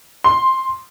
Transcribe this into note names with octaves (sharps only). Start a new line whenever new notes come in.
C6